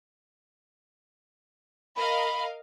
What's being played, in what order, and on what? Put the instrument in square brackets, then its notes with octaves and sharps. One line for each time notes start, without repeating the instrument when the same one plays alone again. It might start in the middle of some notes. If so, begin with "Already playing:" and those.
[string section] A#4 D#5 F5 [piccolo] B5